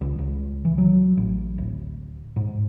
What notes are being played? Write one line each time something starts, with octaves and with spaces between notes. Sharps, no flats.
C#2
C#2
E3
F#3
A1
D1
G#2